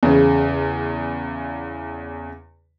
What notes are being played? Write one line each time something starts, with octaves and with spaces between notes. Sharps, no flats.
E2 C#3